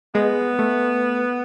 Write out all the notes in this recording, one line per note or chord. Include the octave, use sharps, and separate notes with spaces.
G#3 B3
A3